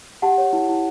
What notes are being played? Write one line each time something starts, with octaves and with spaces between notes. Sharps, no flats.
G4 F#5 A5
C#5
E4
E4